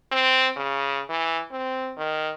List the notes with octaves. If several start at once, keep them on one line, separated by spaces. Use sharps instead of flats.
C4
C#3
E3
C4
D#3